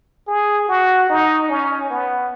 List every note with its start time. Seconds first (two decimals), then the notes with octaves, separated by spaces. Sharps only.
0.28 G#4
0.68 F#4
1.10 D#4
1.50 C#4
1.90 B3